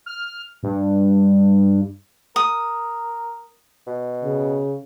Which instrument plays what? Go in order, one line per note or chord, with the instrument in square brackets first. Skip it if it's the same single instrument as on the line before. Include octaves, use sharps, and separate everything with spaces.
[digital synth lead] F6
G2
[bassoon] A#4 [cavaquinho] D#6
[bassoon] B2
[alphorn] C#3